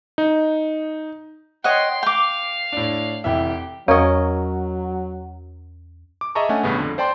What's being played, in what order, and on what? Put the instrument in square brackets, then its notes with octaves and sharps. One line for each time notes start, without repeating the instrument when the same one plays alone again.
[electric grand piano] D#4
[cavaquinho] C#5 D#5 F#5 [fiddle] G5 C6
[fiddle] F5 [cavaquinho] G5 D6
[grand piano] A2 D4
[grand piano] F1 E3 E5 [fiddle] G4
[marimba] E2 [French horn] F#3 [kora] A#4 D#5 [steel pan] C#5
[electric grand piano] D6
G#4 D#5 E5 A5 A#5 C#6
A3 C#4 D4 F#5 G#5
A1 G2 C#3 B3
F2 D3
C5 D5 G5 A5 C6